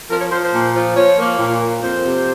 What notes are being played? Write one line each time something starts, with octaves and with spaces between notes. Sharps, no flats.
F3 A#4
C#5
F3 C5
C5
A#2
F3
F3 C#5
A#3
A#2
A#3
F2 C5
C3